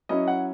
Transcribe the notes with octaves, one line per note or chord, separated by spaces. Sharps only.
F#3 C#4 E4 D#5
F#5